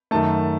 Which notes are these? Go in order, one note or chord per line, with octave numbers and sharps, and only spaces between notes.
F#2 D#3 A3 A5